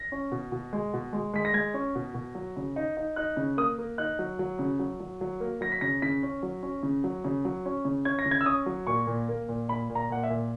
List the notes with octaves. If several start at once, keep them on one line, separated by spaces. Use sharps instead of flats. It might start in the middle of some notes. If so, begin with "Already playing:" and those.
Already playing: A#6
C#4
B2
B2
G#3
B2
G#3
G#3 B6
A#6
G#3 G#6
C#4
B2
B2
F#3
C#3
D#4
D#4
D#4 F#6
C#3
A#3 D#6
A#3
D#4 F#6
F#3
F#3
C#3
F#3
F#3
F#3
A#3
F#3 A#6
B6
C#3 A#6
C#3 B6
C#4
F#3
C#4
C#3
F#3
C#3
F#3
C#4
C#3
C#4 G#6
A#6
C#3
G#6
E6
C#4 D#6
F#3
A#2 C#6
A#2
A#3
A#2
A#2 B5
A#2
A#5
A#2 F#5
E5
A#2